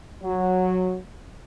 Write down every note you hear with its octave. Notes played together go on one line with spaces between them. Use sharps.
F#3